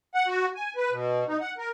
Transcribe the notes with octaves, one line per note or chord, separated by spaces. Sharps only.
F#5
F#4
G#5
B4
B2
D#4
F#5
A#4